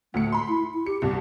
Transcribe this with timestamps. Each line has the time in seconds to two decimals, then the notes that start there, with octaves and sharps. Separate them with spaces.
0.14 D2 A2 A3 C#7
0.32 B5 C6
0.48 E4
0.74 E4
0.86 G4 C#7
1.02 C2 G2 B2 G4